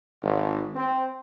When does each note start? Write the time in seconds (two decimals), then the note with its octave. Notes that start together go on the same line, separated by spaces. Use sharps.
0.23 G#1
0.75 C4